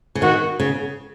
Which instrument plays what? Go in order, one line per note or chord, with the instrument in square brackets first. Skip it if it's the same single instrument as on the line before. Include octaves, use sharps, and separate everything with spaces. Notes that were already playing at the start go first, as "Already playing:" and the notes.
[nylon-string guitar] C#3
[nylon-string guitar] D#3 [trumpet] F#4
[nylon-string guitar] C#3